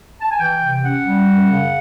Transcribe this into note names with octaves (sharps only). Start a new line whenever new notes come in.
A5
G#5
E3 G5
C3
C#4 F#5
G3
F#2
C#3